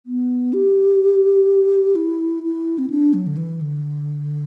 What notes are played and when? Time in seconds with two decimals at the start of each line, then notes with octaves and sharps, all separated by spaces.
0.06 B3
0.53 G4
1.95 E4
2.43 E4
2.78 C4
2.90 D4
3.13 F#3
3.27 D3
3.37 E3
3.61 D3